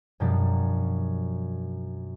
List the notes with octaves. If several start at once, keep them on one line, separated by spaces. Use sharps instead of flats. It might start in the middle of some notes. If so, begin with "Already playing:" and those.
F#2 B2 F3 G3 D4